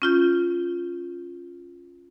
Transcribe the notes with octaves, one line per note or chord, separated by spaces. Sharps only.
C#4 F4 G6